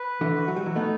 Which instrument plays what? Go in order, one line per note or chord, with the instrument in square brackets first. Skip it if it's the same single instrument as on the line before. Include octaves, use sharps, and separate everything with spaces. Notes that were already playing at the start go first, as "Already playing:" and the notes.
Already playing: [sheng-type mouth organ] B4
[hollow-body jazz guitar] D3 E3
[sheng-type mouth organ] F#4
[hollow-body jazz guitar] F#3
G3
E3 F#3
[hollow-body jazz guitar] A3 B3 [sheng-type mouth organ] D#4